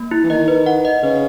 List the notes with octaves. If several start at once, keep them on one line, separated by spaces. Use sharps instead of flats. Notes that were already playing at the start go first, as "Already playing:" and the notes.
Already playing: A#3
E4
E3
D#3 D#5
B4
F#5
D#5
C#3 B4